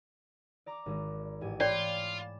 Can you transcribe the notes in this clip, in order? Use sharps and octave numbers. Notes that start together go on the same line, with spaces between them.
D5 A#5 D6
G#1 G#3
A1 G#2 G#5
F4 C#5 D5 G5 B5 D6 G#6
E7